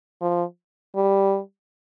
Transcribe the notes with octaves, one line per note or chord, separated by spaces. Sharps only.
F3
G3